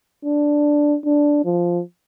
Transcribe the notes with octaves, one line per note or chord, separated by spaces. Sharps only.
D4
D4
F3